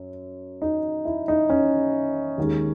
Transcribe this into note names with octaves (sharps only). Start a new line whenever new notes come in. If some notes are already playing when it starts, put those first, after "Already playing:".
Already playing: F#2
D#4
E4
D#4
C#4
D#2 D#3 G#3